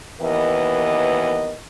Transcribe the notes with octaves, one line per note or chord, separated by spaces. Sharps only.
D#2 E3 B3 A#4 D#5